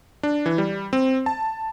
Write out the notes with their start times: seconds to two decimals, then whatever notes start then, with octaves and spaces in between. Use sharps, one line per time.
0.23 D4
0.46 E3
0.58 G3
0.93 C4
1.26 A5